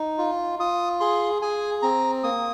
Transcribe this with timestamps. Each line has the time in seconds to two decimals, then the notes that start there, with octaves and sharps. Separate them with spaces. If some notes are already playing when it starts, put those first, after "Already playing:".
Already playing: D#4
0.18 F4
0.59 F4 D#6
1.00 G#4 C6
1.42 G#4 G#5
1.82 C4 A#5
2.24 A#3 D#6